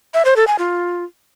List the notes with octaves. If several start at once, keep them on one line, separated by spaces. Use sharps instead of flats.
E5
C5
A4
G#5
F4